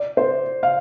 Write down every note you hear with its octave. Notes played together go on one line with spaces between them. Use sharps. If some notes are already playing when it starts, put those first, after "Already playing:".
Already playing: D5
C5
F5